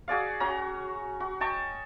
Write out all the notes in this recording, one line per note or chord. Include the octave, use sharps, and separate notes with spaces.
F#4 G#4 D5 F5
C#4 F#4 A#5
F#4
D#5 G5 A5 C#6